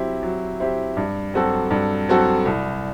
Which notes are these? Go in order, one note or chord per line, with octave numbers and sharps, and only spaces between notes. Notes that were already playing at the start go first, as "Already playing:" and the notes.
Already playing: F#3 C4 E4 G4
F#3
C4 E4 G4
G2
F#3 C4 F#4 A4
G2
F#3 C4 F#4 A4
C2